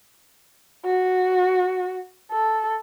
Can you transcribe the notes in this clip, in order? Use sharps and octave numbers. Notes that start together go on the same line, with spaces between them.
F#4
A4